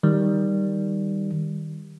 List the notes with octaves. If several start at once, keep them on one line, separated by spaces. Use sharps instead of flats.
D#3 G3